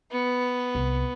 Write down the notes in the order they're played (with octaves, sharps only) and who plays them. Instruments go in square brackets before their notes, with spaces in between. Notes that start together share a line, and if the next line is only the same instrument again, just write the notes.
[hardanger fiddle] B3
[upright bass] C2